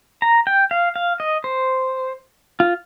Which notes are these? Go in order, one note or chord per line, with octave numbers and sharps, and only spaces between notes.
A#5
G5
F5
F5
D#5
C5
F4